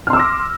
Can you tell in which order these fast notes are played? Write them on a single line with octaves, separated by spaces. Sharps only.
F6 C6 E6 D6 A#6